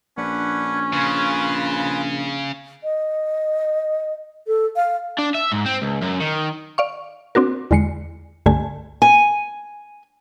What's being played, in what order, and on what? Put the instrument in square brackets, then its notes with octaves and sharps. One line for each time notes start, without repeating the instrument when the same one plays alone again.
[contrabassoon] A#1 [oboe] C#4 [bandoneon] D4 B4 F#5
[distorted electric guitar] C#3 [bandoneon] F4 G#4 B4
[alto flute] D#5
A4
F5
[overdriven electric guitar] D4
E5
G#2
C4
C#2
F#2
D#3
[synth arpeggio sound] D5 F5 C#6
C4 D4 F#4 A#4
E2 D3 G#3 C7 C#7
C#2 G2 D3 A3 G#5
[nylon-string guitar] G#5